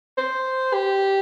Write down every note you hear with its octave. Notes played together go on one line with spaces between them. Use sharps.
C5
G4